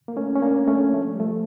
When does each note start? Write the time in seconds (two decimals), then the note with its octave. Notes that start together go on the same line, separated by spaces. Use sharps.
0.08 A#3
0.16 A3 C#4
0.36 C#4
0.42 A#3 D4
0.68 A3 C#4
0.93 F3 A3
1.15 G3
1.19 F3 A3